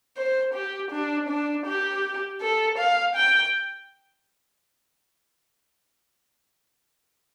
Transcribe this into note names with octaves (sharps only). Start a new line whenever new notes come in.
C5
G4
D4
D4
G4
A4
F5
G5